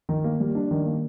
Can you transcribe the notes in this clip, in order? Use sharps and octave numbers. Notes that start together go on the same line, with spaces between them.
D#3
A#3
G3
D4
D#3
A#3